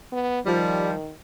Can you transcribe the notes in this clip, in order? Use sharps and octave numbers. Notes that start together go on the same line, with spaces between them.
B3
D#3 F3 G3